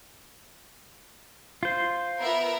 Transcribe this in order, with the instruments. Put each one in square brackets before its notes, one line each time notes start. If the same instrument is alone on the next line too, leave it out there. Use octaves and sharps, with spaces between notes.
[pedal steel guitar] F4 C5
[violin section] B3 A#4 E5